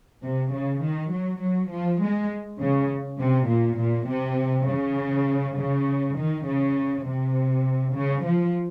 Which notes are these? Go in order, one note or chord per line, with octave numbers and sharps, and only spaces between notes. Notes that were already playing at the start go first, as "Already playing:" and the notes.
C3
C#3
D#3
F#3
F#3
F3
G#3
C#3
C3
A#2
A#2
C3
C#3
C#3
D#3
C#3
C3
C#3
F3